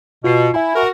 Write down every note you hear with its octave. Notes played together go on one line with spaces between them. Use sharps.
B2 F4 C7
E4 E5 G#5 B5
F#4 A#4